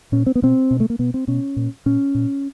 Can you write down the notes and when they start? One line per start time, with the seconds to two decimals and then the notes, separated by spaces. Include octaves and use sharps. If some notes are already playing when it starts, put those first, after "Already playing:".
0.12 A#2 C#4
0.26 C4
0.35 B3
0.42 B2 C4
0.71 B2
0.80 A3
0.90 A#3
0.99 B2 B3
1.14 C4
1.28 B2 C#4
1.56 A#2
1.86 A#2 C#4
2.15 A#2